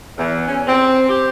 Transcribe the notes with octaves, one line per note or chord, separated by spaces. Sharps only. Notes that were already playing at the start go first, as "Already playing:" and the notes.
E2
C#4
C4
G4